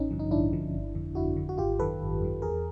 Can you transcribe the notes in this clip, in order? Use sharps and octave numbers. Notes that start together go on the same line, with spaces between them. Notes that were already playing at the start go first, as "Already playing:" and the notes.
Already playing: A1 C#4 D#4
G2 D3 F3
D#4
A1 D4 E4
G2 D3 F3
G1
F2 D3
G1 E4 F#4
F2 D3
F#4
G#1 F4 G4
F#2 D#3 A4 B4
G#1
F#2 D#3
E2 G#4 A#4